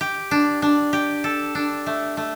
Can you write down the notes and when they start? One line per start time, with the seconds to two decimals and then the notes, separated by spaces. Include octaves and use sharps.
0.01 G4
0.31 D4
0.62 D4
0.93 G4
1.24 A4
1.55 D4
1.86 A3
2.17 A3